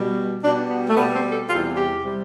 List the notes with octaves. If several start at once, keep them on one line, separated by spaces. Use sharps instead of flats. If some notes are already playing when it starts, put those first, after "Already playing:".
Already playing: B2 G3
B2 G3 D4
B3
A3
B2 G3 B3
C4
A4
E2 C3 G3 F4
G4
C3 G3